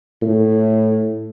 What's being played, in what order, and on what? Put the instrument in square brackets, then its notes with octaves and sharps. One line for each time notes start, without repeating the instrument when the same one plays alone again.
[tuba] A2